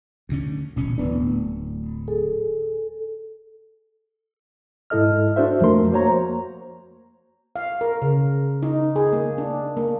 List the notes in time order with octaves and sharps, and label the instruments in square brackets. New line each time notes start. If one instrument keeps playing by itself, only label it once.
[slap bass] D2 D3 C#4
[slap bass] E1 C#4 [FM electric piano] A#2
[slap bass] D1 [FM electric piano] E3 B3 D4
[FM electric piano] A2
[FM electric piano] G#4 [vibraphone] A4
[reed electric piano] G#2 E4 A4 D#5 F6
D4 F#4 C5 E5
F2 F3 A3 A#3 A#4 C6
A#3 F#4 C5 C#5 A#5
[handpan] F5
A#4
C#3
D#4
G#4
A#3
D4
A#3